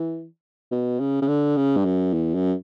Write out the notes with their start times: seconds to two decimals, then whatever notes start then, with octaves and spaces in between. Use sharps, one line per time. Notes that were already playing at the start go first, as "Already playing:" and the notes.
Already playing: E3
0.72 B2
1.00 C#3
1.22 C#3
1.28 D3
1.57 C#3
1.77 G2
1.85 F#2
2.14 E2
2.35 F#2